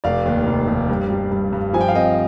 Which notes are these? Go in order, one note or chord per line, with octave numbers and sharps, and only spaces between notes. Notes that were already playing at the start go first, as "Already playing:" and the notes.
F1 D5 F5
D#2
F1
F1
G2
G3
G2
G2
F3 G#5
G5
F5
C4 D#5 G5